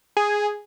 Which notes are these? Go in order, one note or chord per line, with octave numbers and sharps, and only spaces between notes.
G#4